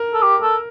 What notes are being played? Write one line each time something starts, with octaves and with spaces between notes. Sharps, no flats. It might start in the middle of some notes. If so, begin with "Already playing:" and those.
Already playing: A#4
A4
G4
A4